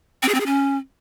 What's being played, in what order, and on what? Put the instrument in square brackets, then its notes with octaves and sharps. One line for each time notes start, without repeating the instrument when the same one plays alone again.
[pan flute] C4
G#4
C4
G#4
C#4